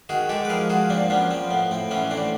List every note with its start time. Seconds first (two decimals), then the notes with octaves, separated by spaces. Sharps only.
0.09 D#3 F#4 G#4
0.29 G#3 G4 A4
0.45 B4
0.49 F3 G#4 A#4
0.69 F3 F#4 G#4
0.90 A#2 C4 D4
1.10 F3 B3 C#4
1.31 F3 C4
1.50 A2 B3
1.71 A2 C4
1.91 E3 B3 C#4
2.11 A2 C4 D4